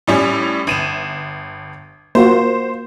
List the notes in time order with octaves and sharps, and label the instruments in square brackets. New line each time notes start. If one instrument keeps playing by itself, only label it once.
[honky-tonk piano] A2 G3 C#4
G1 D#7 E7
[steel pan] A#3 F4 F#4 [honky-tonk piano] C5